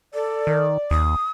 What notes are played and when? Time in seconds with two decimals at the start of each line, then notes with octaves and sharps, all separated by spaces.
0.14 A4 D5
0.47 D#3
0.91 D#2 D#6